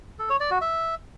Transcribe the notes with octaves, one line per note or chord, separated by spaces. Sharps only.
A4
C#5
D5
F#4
E5